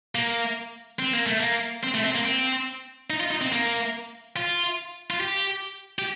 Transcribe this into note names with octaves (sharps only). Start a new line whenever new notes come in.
A#3
C4
A#3
A3
A#3
C4
A3
C4
A#3
C4
D#4
F4
D#4
C4
A#3
F4
F4
G4
G4